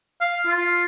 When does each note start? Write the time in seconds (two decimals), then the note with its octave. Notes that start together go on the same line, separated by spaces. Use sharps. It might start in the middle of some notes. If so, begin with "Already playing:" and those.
0.21 F5
0.47 F4